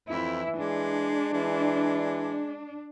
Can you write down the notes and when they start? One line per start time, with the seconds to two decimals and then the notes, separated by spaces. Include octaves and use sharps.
0.10 F2 E3 E4
0.59 G#3 D4
1.33 E3 G#3